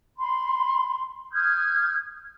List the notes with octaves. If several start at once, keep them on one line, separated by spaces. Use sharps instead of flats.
B5 C6
D#6 F6 G6 G#6